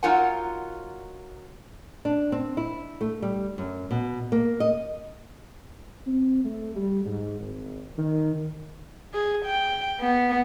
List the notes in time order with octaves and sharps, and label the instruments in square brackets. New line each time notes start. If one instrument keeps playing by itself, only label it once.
[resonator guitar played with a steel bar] F#3 D#4 F4 A#4 F#5 G#5
[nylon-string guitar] D4
C4
E4
A3
G3
F#2
B2
A#3
D#5
[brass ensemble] C4
A3
G3
G#2
G#1
D#3
[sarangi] G#4
G5
B3